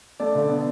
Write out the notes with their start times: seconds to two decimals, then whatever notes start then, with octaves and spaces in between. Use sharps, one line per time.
0.20 A3 D5
0.35 D3
0.49 B3